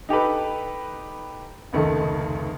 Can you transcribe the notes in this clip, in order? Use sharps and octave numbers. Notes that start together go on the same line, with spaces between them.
D#4 G4 A4 B4
F1 C#2 D#3 A3